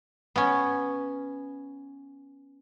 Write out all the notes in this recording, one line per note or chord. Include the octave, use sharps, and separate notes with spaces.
B3 C#4